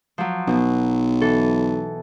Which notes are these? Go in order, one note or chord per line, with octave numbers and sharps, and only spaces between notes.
F3 F#3
B1 B2
E3 A4